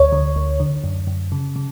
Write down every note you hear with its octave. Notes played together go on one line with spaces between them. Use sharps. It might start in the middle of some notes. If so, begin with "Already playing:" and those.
Already playing: D2 C#5
D3
D2
D3
F#2
F#2
C#3
C#3